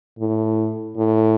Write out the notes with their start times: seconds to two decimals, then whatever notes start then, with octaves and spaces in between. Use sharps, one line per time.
0.19 A2
0.97 A2